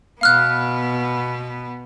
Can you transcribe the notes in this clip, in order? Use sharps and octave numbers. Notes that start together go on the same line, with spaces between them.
B2 B3 F5 F6 F#6